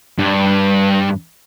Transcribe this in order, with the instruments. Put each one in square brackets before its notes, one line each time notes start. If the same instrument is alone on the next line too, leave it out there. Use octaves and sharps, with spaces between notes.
[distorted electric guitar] G2